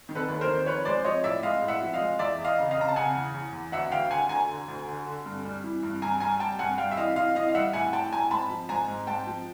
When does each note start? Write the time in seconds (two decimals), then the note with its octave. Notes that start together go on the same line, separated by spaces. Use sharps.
0.09 D#3
0.15 A4 B4
0.28 D#2
0.41 A#4 C5
0.47 D#3
0.66 F3 B4 C#5
0.85 G#3 C5 D5
1.04 F3 C#5 D#5
1.24 A2 D5 E5
1.43 G#3 D#5 F5
1.62 A2
1.68 E5 F#5
1.82 F3
1.94 D#5 F5
2.00 G#3
2.19 E2 D5 E5
2.39 E2
2.45 D#5 F5
2.58 C#3
2.71 D#5 F5
2.77 C#3 A#5
2.89 A5
2.96 C#3 F#5 G#5
3.15 E2
3.34 E2
3.53 E2
3.72 D2 E5 F#5
3.92 D2 F5 G5
4.11 D3 F#5 G#5
4.29 D2 G#5 A#5
4.49 D3
4.68 D2
4.88 D3
5.06 D3
5.26 G2
5.45 G3
5.64 E3
5.83 G2
6.02 G2 G#5 A#5
6.20 G3 G#5 A#5
6.40 G3 G5 A5
6.59 G2 F#5 G#5
6.78 G3 F5 G5
6.91 E5
6.97 E3 D#5 F5
7.16 E3 D#5 F5
7.35 E3 D#5 F5
7.49 F5
7.54 G3 E5 F#5
7.73 A2 F#5 G#5
7.93 A2 G5 A5
8.12 A2 G#5 A#5
8.31 G#2 A5 B5
8.50 F3
8.69 G#2 G#5 A#5
8.88 G#2
9.07 G#2 G5 A5
9.27 F3